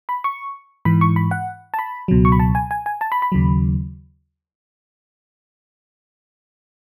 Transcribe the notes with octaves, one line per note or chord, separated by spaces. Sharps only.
B5
C#6
G#2 E3 B5
C#6
B5
F#5
A5
B5
C#2 B2 F#3
C#6
B5
A5
G#5
G#5
G#5
A5
B5
B5
D#2 C#3 F#3